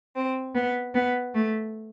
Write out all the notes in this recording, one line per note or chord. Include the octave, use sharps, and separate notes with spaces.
C4
B3
B3
A3